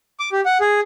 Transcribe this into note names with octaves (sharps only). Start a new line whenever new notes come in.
D6
G4
F#5
G#4